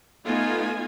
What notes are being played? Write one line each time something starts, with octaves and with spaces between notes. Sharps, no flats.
A3 B3 D#4 F4 G#5